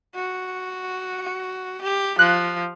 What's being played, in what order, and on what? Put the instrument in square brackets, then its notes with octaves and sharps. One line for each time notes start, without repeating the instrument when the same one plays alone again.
[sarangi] F#4
G4
[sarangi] F3 [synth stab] F#6